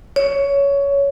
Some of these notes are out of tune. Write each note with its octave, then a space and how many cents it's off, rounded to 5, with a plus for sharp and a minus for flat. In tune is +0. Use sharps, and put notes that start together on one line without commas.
C#5 +15